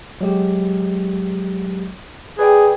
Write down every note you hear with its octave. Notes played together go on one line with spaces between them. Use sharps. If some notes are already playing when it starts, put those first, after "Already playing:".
F#3 G#3 G4
G#4 B4 D5 G5